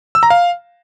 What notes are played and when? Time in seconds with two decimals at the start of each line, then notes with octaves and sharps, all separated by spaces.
0.15 E6
0.23 A#5
0.30 F5